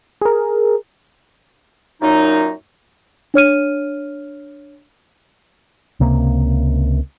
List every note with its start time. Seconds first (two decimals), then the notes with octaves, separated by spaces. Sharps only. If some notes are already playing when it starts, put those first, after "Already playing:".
0.22 G#4 A#4
2.02 F#2 A#2 F#3 D#4
3.34 D4 C#5 F6 D#7
6.00 C#2 C3 A#3